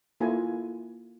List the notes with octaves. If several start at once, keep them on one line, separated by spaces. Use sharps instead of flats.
A#3 E4 F4 A4 G#5